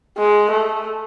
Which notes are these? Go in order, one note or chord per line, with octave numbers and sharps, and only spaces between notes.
G#3
A3